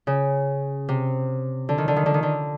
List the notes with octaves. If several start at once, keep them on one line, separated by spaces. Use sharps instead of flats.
C#3
C3
D3
D#3
D3
D#3
D3
D#3
D3